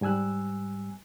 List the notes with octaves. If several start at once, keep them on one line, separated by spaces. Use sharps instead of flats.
G#2 G3 G#5 E6 F#6